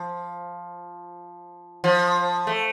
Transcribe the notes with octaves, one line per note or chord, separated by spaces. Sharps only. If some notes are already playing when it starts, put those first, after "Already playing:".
Already playing: F3
F3
A3